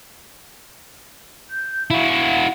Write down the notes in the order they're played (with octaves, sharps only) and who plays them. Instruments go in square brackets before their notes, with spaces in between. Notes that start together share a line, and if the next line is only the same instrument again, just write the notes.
[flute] G6
[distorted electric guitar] E4 F#4 [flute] F5